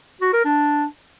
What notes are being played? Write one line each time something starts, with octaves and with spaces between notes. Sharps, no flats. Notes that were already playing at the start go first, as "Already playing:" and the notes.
F#4
A#4
D4